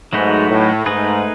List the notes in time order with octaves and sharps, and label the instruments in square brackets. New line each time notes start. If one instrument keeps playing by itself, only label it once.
[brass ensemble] G#2 [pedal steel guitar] F#3 A3 D#4 F#4 B4
[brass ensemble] A2
[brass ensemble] G#2 [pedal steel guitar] A3 D#4 G#4 B4